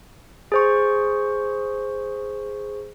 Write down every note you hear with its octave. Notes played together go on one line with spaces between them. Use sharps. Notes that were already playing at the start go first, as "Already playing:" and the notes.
G#4 C5 C#6